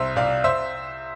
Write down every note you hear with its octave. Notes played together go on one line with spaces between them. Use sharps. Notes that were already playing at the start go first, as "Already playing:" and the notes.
Already playing: C2 C5 E5
C2 D5 F5
C5 E5